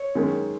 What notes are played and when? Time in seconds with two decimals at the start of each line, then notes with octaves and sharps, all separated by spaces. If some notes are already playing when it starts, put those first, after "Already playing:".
Already playing: C#5
0.15 F#2 D#3 G#3 C#4